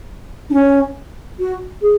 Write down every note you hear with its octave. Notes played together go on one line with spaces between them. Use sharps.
D4
C#4
F#4
G#4